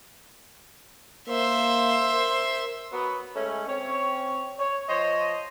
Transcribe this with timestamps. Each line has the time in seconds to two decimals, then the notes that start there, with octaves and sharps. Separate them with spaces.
1.29 A#3 C5 E5
2.12 A#4
2.93 F#3 B3
3.36 G#3 A3 C#4
3.68 C4 C#4 C#5
4.59 C#5
4.89 F3 C5 C#5 D#5